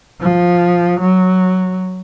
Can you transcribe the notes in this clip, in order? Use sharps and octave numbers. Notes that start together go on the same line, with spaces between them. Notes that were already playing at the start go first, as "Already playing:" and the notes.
F3
F#3